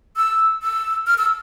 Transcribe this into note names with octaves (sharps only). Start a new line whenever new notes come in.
E6
E6
F6
E6